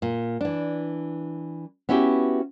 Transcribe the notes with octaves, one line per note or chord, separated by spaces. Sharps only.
A#2
E3 D4
B3 C#4 E4 F#4 G4